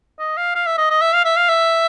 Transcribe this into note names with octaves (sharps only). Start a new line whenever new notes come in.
D#5
F5
F5
E5
D#5
D#5
E5
F5
E5
F5
E5